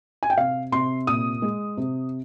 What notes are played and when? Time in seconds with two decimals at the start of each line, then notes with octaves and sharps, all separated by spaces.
0.23 G#5
0.30 G5
0.37 C3 F5
0.72 C3 C6
1.07 A#2 D#6
1.42 G#3
1.77 C3